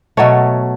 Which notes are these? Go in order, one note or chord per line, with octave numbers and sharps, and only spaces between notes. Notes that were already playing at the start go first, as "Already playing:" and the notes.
B2 F#3 A3 C#5